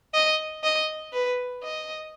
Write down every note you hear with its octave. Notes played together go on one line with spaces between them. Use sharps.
D#5
D#5
B4
D#5